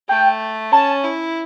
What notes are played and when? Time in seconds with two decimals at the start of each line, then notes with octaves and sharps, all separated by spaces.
0.08 A3 G5
0.72 C#4 A5
1.04 E4